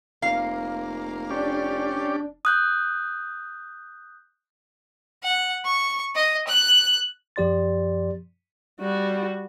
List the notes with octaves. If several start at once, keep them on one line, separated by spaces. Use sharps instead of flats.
F1 A#3 F5
C#4 D4 G4 D5
D#6 F#6 G6
F#5
C#6
D#5
F#6
F#2 F3 G4 D5 C6 A6
G3 F#4